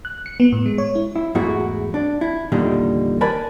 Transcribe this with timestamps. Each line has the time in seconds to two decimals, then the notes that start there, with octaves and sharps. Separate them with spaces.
0.05 F#6
0.26 C#7
0.40 B3
0.52 A2
0.66 G#3
0.78 C#5
0.95 E4
1.16 E4
1.35 E2 G#2 A3 E4 F#4
1.94 D4
2.21 E4
2.52 E2 A#2 D3 D#3 G3 D#4
3.21 A#4 B4 D5 G#5 A5 B5